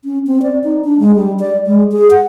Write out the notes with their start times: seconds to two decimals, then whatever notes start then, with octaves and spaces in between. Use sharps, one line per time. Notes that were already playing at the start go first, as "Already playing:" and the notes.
0.05 C#4
0.27 C4
0.42 D5
0.64 D#4
0.84 D4
1.00 G#3
1.16 G3
1.40 D5
1.67 G#3
1.92 G#4
2.11 F#5